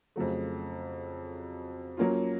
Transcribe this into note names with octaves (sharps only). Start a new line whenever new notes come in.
F2 C#3 F#3 A3
F#3 A#3 C#4 F4